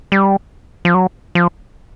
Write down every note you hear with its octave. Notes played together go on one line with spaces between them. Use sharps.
G3
F3
F#3
F3